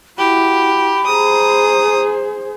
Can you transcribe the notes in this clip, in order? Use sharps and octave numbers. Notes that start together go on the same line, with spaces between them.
E4 F#4 G4 B5
G#4 C5 A#5 D#6